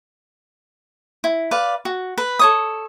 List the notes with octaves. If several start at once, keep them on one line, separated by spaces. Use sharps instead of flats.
E4
B4 D5 F5
F#4
B4
A4 C#5 D#6